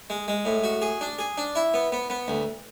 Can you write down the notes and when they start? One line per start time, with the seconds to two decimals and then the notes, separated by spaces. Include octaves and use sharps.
0.10 G#3
0.28 G#3
0.45 A2
0.64 F#4
0.82 G#4
1.01 D4
1.19 G#4
1.38 D4
1.56 E4
1.74 B3
1.92 B3
2.10 B3
2.28 D2